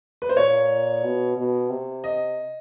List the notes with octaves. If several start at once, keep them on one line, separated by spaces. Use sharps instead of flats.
B4
C5
A#2 C#5
B2
B2
C3
D#5